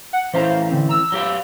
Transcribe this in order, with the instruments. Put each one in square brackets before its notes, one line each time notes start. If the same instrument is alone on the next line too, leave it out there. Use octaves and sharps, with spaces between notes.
[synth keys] F#5
[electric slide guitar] E3 C#4 E4 [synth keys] C5 F5 A#5
[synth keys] D3 C4
A#5 E6
[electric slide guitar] F#3 G4 F5